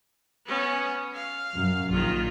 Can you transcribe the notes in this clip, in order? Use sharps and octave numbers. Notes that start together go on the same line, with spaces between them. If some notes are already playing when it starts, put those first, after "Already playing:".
B3 C#4
F5
F#2
A#1 D#3 F4